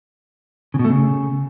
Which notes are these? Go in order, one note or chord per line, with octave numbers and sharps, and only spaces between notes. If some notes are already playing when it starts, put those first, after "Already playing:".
C#3
B2
A3
C#3